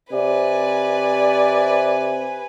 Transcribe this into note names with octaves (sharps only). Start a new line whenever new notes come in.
C3 B4 D5 G#5